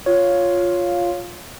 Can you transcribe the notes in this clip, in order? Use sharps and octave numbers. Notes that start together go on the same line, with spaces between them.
F4 C#5